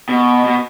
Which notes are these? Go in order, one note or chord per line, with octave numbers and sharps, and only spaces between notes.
B2
B2